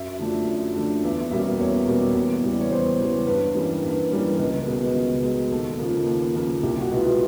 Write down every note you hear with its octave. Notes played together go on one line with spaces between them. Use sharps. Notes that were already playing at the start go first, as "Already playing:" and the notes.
Already playing: F#2 E5
D3 F3 A3 D4
F#2
D3 F3 A3 D4
E2 E5
B2 G3 A#3 C#4 E5
E2 C#5
B2 G3 A#3 C#4
E2
C#3 E3 G3
D5
C#5
E2 C5
C#3 E3 G3
G2 B4
E3 G3 A#3 C#4
G2
E3 G3 A#3 C#4
C#2 A#4
B2 G#3 B3
C#2
B2 G#3 B3
D#2 A4
C#3 F3 A#3
D#2
C#3 F3 A#3
C2 G4
F#4
B2 G#3 B3 E4
F4